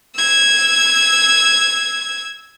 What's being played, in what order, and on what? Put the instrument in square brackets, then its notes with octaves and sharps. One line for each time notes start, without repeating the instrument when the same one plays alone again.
[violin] E6 G#6